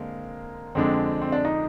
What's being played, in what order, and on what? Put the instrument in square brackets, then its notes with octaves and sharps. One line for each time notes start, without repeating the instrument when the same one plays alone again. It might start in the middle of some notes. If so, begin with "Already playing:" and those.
Already playing: [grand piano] D3 G#3 C4 [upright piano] A#3
[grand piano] F2 D3 G#3 D4 [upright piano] C4
[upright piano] C4
D4
D#4